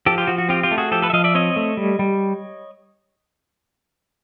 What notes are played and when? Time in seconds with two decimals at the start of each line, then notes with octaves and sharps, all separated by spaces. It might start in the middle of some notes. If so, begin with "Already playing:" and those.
0.06 F3 G4 A4
0.18 F4 G4
0.27 F3 F#4
0.38 F#4
0.49 C4 F4 G4
0.63 F4 G4
0.71 A3
0.78 F#4 G#4
0.91 F3 G4 A4
1.02 A4 B4
1.10 E5
1.13 F3 D#5 F5
1.24 D5 E5
1.35 C4 C#5 D#5
1.56 A3
1.77 G3
1.99 G3